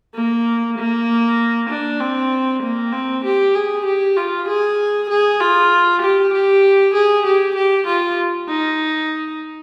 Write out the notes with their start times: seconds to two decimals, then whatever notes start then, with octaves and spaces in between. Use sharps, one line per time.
0.15 A#3
0.78 A#3
1.70 D4
2.00 C4
2.63 A#3
2.93 C4
3.25 G4
3.55 G#4
3.85 G4
4.16 F4
4.48 G#4
5.09 G#4
5.40 F4
6.02 G4
6.33 G4
6.95 G#4
7.26 G4
7.56 G4
7.87 F4
8.49 D#4